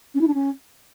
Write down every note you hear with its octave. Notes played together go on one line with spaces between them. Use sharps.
C#4
E4
D4
C#4